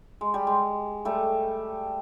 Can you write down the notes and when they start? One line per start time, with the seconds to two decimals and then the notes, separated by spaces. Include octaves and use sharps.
0.21 G#3
0.34 G3
0.47 G#3
1.05 G3 A3